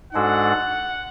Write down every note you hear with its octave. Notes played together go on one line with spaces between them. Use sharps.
G#2 G#3 D4 F#4 A4 F#5